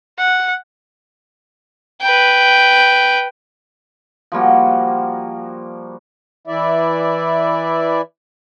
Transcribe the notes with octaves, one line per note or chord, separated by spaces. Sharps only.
F#5
B4 G5
F3 G3 A#3 F#4
E3 E4 D5 E5